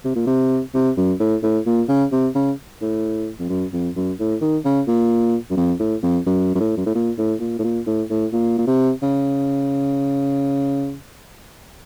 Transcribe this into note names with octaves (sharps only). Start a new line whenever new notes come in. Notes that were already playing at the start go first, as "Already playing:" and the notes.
C3
A#2
C3
C3
F#2
A2
A2
A#2
C#3
C3
C#3
A2
F2
F#2
F2
F#2
A2
D#3
C#3
A#2
F#2
F2
A2
F2
F#2
F#2
A2
F#2
A2
A#2
A2
A#2
A2
A#2
A2
A2
A#2
A#2
C3
C#3